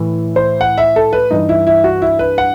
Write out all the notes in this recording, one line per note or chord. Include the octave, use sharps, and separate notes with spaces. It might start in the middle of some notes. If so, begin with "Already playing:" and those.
Already playing: A2 E3
C5
F#5
E5
A4
B4
G2 E3 D#4
E4
E4
F#4
E4
B4
F#5